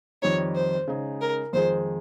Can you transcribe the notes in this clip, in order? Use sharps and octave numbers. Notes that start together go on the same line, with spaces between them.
F2 D#3 G3 C4 D#4 C#5
C5
C#3 G#3 D#4 G#4
A#4
F2 D#3 G#3 D#4 G#4 C5